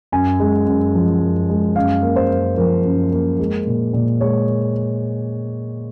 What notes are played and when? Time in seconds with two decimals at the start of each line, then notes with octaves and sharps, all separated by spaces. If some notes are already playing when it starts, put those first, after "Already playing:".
0.12 F#2 G#5
0.40 G#3
0.67 F#2
0.95 F3
1.22 F#2
1.49 G#3
1.76 F#2 F5
2.02 A#3
2.16 C5
2.30 F#2
2.57 F3 A#4
2.84 F#2
3.11 A#3
3.39 G#3
3.67 A#2
3.93 A#2
4.21 G#3 C#5